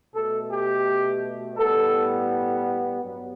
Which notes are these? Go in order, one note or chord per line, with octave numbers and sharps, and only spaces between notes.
B2 A3 A4
G4
A2 G3 B3 A4
G2 F#3 B3